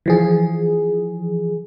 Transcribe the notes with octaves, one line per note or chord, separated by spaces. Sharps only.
E3 F3 G#4